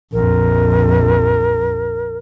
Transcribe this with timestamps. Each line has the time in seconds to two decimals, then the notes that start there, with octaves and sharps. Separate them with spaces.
0.13 A#1 F2 A#4